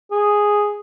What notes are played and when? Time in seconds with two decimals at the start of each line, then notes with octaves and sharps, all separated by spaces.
0.11 G#4